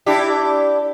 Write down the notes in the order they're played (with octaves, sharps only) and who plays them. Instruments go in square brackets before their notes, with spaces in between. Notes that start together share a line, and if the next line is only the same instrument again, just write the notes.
[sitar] D4 E4 G4